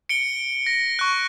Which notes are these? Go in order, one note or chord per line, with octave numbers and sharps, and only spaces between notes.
C#7 D7 G7
A#6
C#6 F#6